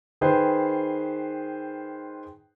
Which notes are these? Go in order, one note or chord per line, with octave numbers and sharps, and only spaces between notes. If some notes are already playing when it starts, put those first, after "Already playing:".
D#3 G#4 B4 C5 G5